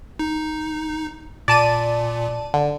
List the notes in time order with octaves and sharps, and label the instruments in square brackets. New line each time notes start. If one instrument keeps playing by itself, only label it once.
[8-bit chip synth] D#4
[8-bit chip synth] A#2 [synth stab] D5 A5 D#7
[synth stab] D3